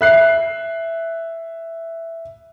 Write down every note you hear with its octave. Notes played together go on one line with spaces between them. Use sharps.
E5 F#6 C7